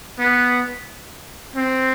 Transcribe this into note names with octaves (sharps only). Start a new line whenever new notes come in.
B3
C4